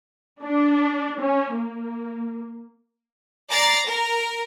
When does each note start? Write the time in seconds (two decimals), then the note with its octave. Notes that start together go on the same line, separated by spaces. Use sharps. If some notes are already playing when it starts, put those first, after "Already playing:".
0.44 D4
1.21 C#4
1.54 A#3
3.49 D5 A#5 A6 C7
3.86 A#4